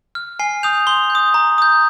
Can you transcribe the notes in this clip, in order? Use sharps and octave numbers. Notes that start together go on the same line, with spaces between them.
F6
G#5 C7
D#6 G6 F7
C6 G7
G6
D#6
A#5
D#6 G6